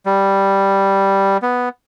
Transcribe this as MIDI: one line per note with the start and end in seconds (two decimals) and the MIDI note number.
0.06 1.37 55
1.42 1.69 59